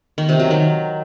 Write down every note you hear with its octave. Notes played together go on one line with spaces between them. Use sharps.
D#3
C3
F#3
D#3